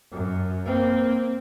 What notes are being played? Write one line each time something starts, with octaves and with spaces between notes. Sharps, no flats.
F#2
A#3 C4